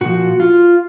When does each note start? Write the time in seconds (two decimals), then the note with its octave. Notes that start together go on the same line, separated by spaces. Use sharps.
0.01 A#2 F3 F#4
0.40 F4